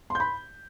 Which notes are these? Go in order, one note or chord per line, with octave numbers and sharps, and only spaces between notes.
B5 C6 G6